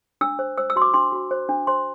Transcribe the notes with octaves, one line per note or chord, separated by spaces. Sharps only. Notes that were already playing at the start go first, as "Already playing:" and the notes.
D4 E6
C5
C5 E6
E6
F#4 C6
D6
D4 C6
F#4
C5
D4
C5 C6